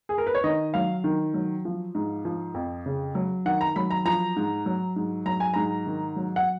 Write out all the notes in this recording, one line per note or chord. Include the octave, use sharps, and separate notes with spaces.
G#4
A#4
B4
C#5
D#3 D#5
F#3 F5
D#3
F#3
F3
G#2
F3
F2
C#3
F#3
D#3 F#5
A#5
F#3 B5
A#5
F3 A#5
G#2
F#3
G#2
F#3 A#5
G#5
G#2 A#5
D#3
F#3
F#5